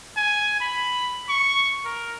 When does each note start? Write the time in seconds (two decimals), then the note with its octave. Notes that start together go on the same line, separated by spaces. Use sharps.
0.17 G#5
0.61 B5
1.29 C#6
1.85 A#4